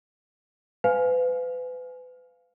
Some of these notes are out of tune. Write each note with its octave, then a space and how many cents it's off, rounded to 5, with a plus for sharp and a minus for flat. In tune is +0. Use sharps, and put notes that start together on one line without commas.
B4 +35 F5 +0 G#5 +10